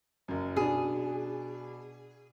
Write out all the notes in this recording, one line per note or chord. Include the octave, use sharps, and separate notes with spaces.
F#1 F#2
B2 D4 G#4